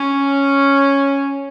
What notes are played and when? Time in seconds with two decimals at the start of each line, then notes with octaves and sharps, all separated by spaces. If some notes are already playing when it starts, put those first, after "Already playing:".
Already playing: C#4